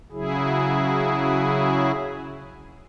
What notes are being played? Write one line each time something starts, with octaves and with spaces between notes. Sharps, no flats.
C#3 F#3 E4 G#4